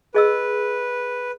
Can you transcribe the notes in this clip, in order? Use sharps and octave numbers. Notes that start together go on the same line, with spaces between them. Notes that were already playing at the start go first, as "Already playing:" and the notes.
G#4 B4 D#5 E6